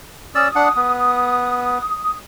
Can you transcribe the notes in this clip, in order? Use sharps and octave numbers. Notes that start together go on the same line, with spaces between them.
C#4 D5 D#6 E6
D4 F#5
B3